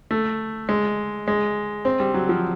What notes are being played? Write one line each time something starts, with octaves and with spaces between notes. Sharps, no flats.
A3
G#3
G#3
C4
G3
F#3
F3